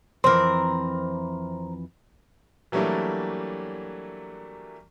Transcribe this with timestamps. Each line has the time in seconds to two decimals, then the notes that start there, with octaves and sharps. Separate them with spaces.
0.24 F2 E3 C4 A#4 C6
2.72 E3 F#3 G3 A3 A#3 D4